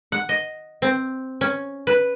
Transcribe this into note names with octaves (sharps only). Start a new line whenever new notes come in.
F#5
D#5
C4
C#4
B4